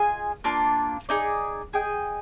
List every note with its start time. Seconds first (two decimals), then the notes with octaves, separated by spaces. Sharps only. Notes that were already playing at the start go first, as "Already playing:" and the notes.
Already playing: F4 G#4 D#5 G#5
0.44 A#3 D4 F4
1.09 D#4 G#4 D5
1.73 G#4 D#5 G5